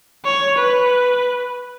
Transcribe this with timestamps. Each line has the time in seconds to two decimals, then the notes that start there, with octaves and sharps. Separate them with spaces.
0.25 C#5
0.58 B4